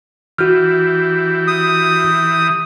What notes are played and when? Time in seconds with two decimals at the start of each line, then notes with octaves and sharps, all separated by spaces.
0.38 E3 F#4 G4 F6
1.47 D#6